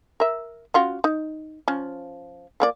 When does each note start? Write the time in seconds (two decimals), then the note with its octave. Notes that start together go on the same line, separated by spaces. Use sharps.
0.20 A#4 E5
0.74 C#4 F4 F#4
1.04 D#4
1.68 F3 C#4
2.60 F3 A#3 D5